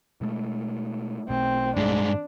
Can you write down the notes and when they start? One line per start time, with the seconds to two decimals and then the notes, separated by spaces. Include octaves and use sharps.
0.21 B2 G#3 A3
1.29 B1 B2 A3 C4
1.76 G2 G#3 D4